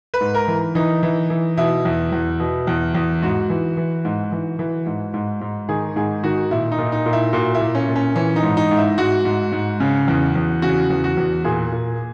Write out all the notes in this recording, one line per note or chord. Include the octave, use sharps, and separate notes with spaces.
B4
G#2
A#4
E3
E3 D#4
E3
E3
B2 E4
E2
E2
B2
E2
E2
G#2 F#4
E3
E3
G#2
E3
E3
G#2
G#2
G#2
D#3 G#4
G#2 G#4
D#3 F#4
A#2 E4
D#4
A#2
D#4
A#2
E4
A#2 F#4
E4
A#2
C#4
A#2
C#4
E3 C#4
D#4
G#2
D#4
G#2
E4
G#2 F#4
G#2
G#2
C#3
E2
E2
C#3 F#4
E2
F#4
E2
A#2 G#4
A#2